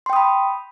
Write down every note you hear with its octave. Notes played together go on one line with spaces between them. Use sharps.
G5 B5 C6 D#6